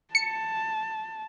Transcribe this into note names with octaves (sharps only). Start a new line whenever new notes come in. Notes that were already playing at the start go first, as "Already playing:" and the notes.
A5 C#7